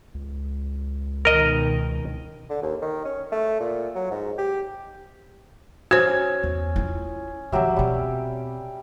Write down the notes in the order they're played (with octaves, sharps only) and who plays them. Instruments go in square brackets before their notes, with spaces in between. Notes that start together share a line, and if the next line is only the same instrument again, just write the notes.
[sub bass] C#2
[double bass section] B2 D#3 [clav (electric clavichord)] A#4 D#5
[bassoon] D3
D#2
D#3
C#4
A3
A#2
F#3
G#2
G4
[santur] C#4 [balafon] F#4 C5 [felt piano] G#6
[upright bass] E2
E4 F4
[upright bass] D#3 F3 [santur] F#3 G4 E5
[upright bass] B2 C4 [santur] G3